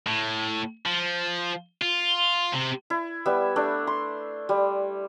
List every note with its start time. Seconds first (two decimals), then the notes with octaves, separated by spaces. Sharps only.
0.07 A2
0.86 F3
1.82 F4
2.54 C3
2.90 E4
3.26 G3 B3 E5
3.56 A3 D4
3.87 C6
4.49 G3